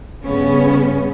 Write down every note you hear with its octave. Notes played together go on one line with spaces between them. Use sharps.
G2 C#3 B3 C#4